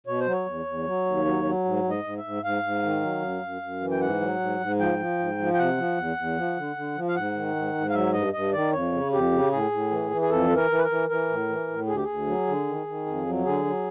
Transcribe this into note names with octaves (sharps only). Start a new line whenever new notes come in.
B2 C#5
C5
F#3
C#5
E2
E2
F#3
D#2
F#3
F#3
G#2
G#2
D#5
G#2
E5
G#2
G#2 F5
G#2
D#3
F#3
F#2
F#2
F#2
E3
G5
G#2 F#5
F#3
G#2
G#2
F3 G5
F3
G#2
F3
G5
C3 F#5
F3
E2
E2
F3
D3
D3
F3
F5
G#2 F#5
D#3
G#2
G#2
F5
F#3 E5
G2 D#5
G2 D#5
D#3 D5
F2 C#5
C#3
F2 G4
C#3
A2 G#4
A2
E3
E3
G#4
F2 A4
E3
A#4
E3
B4
A#4
E3
E3 A#4
A2
E3
A2
D2 G#4
G4
D2 G#4
F#3
D3
D#3
D#3
F2
F#3
D3 G#4
F#3